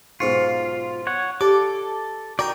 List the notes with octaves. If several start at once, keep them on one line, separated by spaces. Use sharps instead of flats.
B1 G#2 F4 C#6
C#5 F#5
G4 A4 D5 D6
D#4 F#4 A#4 D5 G5